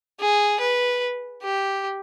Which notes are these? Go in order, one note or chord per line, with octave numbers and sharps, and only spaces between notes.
G#4
B4
G4